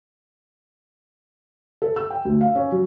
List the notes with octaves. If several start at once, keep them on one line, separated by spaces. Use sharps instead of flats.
A4
E6
G5
D2
F5
C#4
F#3